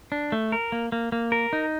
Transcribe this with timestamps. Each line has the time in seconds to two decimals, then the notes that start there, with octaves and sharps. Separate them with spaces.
0.12 D4
0.32 A3
0.52 A#4
0.72 A#3
0.92 A#3
1.12 A#3
1.32 A#4
1.53 D#4